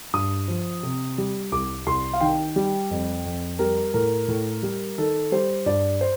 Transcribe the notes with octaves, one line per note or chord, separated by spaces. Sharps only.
G2 D#6
F3
C3
G3
C2 D6
C2 C6
F5
D#3 G5
G3
F2
F2
G3 A#4
A2 A#4
A2
G3
D#3 A4
G3 C5
G2 D5
C5